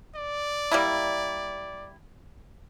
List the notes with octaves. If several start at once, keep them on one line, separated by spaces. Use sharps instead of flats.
D5
G3 A#3 E4